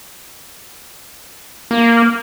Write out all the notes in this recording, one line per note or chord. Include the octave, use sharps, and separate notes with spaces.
A#3